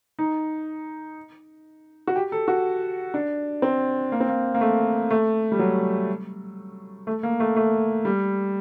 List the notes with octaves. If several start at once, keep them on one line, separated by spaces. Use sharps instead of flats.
D#4
F#4
G4
A4
F#4
D4
C4
A#3
C4
A#3
A#3
A3
A3
G3
F#3
A3
A#3
A3
A3
G3